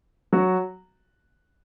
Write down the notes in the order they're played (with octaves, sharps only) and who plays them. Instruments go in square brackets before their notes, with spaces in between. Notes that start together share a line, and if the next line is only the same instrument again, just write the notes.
[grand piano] F#3 F#4